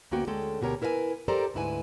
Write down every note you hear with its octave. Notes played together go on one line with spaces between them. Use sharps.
D2 A#3 B3 C#4 F#4 G5
D2 G#3 C#4 A4 G5
D2 B2 G4 A#4 C#5
E4 A#4 B4 F5 G#5
G4 A4 A#4 C5 D5 A#5
D2 G#2 E4 B4 G#5